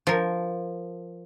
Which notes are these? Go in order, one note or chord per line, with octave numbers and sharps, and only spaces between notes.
F3 A#4